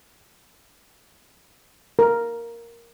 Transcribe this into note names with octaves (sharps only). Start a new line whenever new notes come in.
A#4